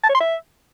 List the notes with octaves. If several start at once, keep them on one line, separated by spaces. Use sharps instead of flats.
A5
C#5
C6
E5